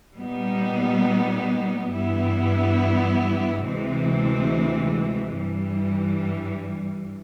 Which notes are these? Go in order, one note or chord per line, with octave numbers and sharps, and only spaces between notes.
A#2 G3 B3 D#4
G2 E3 G3 B3 E4
D2 C3 E3 G#3 C4
G2 E3 G3